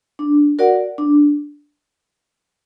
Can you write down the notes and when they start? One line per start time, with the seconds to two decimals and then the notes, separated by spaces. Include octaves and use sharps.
0.19 D4
0.59 F#4 A#4 D5 F#5
0.98 D4